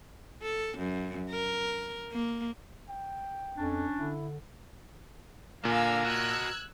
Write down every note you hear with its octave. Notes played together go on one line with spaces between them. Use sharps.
A4
F#2
A#4
A#3
G5
F2 C#4 D4
D3 E4
A#2 D3 A#4 F5 G#5 E6
F#4 D#5 E6 F#6 G#6